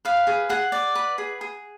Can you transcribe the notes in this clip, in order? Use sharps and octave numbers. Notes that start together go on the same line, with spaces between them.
B4 F5
G#4
G#4 F#5
D5
B4
G#4
G#4